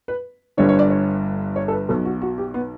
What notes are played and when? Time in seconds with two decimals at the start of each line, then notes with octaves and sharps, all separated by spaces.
0.08 B4
0.57 G1 G2 D3 C#5
0.69 C#5
0.79 D5
0.90 C#5
1.56 C#5
1.68 A4
1.72 B4
1.89 B1 B2 A4
2.05 F#4
2.22 F#4
2.38 G4
2.54 B3